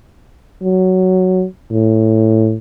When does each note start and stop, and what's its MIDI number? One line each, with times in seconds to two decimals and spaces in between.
0.63 1.45 54
1.71 2.56 45